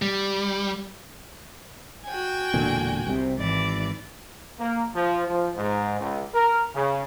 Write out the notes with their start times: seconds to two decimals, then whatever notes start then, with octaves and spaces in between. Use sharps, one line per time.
0.02 G3
2.06 F#4 G5 G#5
2.54 E1 A#2 D3
3.07 C2 C3
3.38 G#1 E3 D5
4.59 A#3
4.95 F3
5.26 F3
5.56 G#2
6.00 C#2
6.33 A#4
6.75 C#3